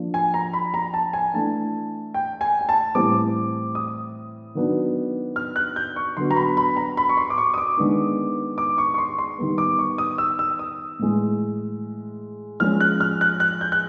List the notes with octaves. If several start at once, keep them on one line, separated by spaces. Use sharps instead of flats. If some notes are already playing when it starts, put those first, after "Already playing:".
Already playing: F3 A#3 D4
G#5
A#5
B5
A#5
A5
G#5
E3 A3 D4 A5
G5
G#5
G#5
A5
A2 E3 G3 C4 D6
D#6
D#3 F#3 B3 D4
F6
F#6
G6
C#6
D3 F#3 B3 C6
A#5
B5
B5
A#5
B5
C#6
C6
D6
C#6
D#6
D6
D#3 G#3 B3 D4
D6
C#6
C#6
C6
C6
D#3 G3 B3
D6
C#6
D#6
E6
E6
D#6
A2 E3 G#3
F3 G#3 C#4 F6
F#6
F6
F#6
F#6
G6
F#6